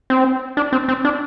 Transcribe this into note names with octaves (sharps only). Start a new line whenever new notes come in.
C4
D4
C4
C4
D4